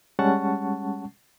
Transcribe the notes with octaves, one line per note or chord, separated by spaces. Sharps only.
G3 G#3 C#4 F#5 A5 C#6